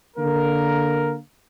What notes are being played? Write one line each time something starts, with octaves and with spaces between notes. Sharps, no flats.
D3 A#3 A#4